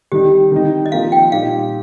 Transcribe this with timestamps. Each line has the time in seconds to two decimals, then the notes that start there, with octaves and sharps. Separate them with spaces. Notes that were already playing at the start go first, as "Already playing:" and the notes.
0.12 D#3 G3 D#4 G4
0.52 D#3 G3 D#4
0.86 D#5
0.92 F3 A#3 D#4 F5
1.12 G5
1.32 A#2 G3 D#4 F5